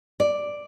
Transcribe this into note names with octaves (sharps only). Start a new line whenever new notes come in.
D5